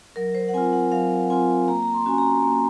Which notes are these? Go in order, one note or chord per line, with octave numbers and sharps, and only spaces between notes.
F#3 A#4
C5
F#5
C4 F4 G#5
F#5
F#3 F5
C4 F4 G#5
A#3 A#5
A#5
C6
C#4 F#4 G#5
A#5
A#3